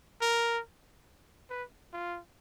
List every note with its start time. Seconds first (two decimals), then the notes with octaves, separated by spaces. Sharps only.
0.21 A#4
1.50 B4
1.93 F4